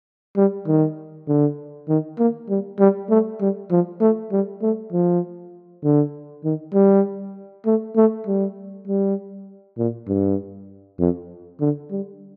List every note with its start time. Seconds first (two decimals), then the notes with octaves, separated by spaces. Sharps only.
0.37 G3
0.68 D#3
1.28 D3
1.89 D#3
2.19 A#3
2.49 G3
2.79 G3
3.10 A3
3.41 G3
3.71 F3
4.01 A3
4.32 G3
4.62 A3
4.93 F3
5.84 D3
6.44 D#3
6.74 G3
7.66 A3
7.96 A3
8.27 G3
8.88 G3
9.78 A#2
10.08 G2
11.00 F2
11.61 D3
11.91 G3